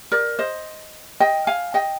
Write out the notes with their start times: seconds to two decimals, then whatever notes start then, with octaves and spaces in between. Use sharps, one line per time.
0.12 A#4 D5
0.39 C5 D#5
1.20 D#5 G5
1.47 F5 G#5
1.74 D#5 G5